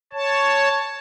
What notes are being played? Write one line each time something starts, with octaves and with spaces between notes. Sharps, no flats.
C#5 A5